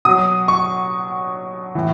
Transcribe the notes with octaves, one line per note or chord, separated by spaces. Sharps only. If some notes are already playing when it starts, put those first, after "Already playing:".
B2 F#3 D#6
C#6
A2 E3